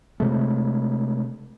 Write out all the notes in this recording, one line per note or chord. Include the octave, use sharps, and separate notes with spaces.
C3 G#3 A3